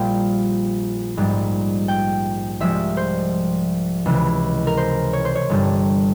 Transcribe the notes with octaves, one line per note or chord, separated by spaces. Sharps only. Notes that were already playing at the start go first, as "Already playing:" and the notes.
Already playing: A#1 A#2 G3 F5 G5
A#1 G#2 G3
G5
C2 C3 F3 G#3 E5
C5
C#2 C3 E3
A#4
C5
C#5
C5
C#5
G1 G2 G3